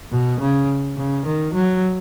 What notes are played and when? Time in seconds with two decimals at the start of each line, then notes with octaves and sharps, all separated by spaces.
0.12 B2
0.40 C#3
0.98 C#3
1.26 D#3
1.54 F#3